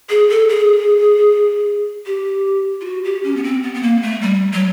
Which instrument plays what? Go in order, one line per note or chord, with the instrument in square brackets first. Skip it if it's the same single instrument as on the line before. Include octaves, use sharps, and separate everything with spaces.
[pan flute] G#4
A4
G#4
G4
F4
F#4
G4
C#4
B3
C4
B3
B3
A#3
A3
G3
F#3